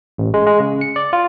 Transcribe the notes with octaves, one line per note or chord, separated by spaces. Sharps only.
A1
G#3
G#3
C#3
C#7
D5
F4